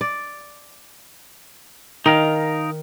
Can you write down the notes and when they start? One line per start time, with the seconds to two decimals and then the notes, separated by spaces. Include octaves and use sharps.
0.01 D5
2.06 D#3 D#4 A#4 F5